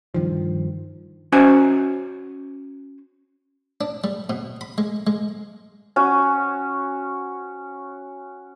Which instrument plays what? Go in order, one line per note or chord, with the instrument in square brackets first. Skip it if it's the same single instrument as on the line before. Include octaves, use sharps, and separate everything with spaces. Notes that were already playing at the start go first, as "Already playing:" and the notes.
[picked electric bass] G2 D#3 F3
[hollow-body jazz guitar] C#4 F#4 C5 G#5
[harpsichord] D4
G3
B2
B5
G#3
G#3
[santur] C#4 F#4